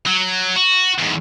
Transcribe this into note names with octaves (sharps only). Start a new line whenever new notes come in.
F#3
F#4
E2 G#2